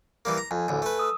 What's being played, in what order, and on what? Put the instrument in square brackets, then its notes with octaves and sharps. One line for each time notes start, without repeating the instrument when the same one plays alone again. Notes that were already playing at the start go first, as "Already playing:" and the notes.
[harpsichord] E3 G3 A#3
A#5
[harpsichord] F2 [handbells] G#5
[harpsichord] A1 D2
A3 B4
[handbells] D#6 E6